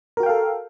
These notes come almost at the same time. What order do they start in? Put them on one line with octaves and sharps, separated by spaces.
A#4 F#4 G5 F5 A4